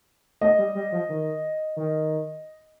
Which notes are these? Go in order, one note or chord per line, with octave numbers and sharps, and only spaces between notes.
A3 D#5
G3
G3
F3
D#3
D#3